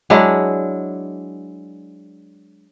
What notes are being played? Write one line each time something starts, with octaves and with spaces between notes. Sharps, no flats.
F#3 G#3 D4 E4